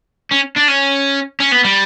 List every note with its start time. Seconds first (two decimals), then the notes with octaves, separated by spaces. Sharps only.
0.31 C#4
0.56 D4
0.68 C#4
1.40 C#4
1.52 B3
1.65 G3